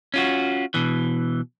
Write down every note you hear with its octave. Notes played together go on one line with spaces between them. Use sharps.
C#4 F4 F#4
B2 E3